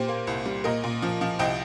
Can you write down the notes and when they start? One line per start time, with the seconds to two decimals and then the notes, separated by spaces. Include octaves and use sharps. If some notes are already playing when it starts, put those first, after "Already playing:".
Already playing: A#2 G4 C5
0.08 A#3
0.27 C2
0.46 G3
0.64 A#2 A#4 D#5
0.84 A#2
1.02 F3
1.21 F3
1.39 C2 D#5 G5